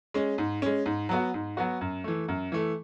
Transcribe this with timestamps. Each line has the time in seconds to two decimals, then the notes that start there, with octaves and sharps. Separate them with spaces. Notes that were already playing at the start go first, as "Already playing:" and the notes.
0.14 G#3 C#4
0.38 G#2
0.62 G#3 C#4
0.86 G#2
1.09 F#3 B3 F#4
1.34 G#2
1.57 F#3 B3 F#4
1.81 F#2
2.04 E3 A3
2.28 F#2
2.52 E3 A3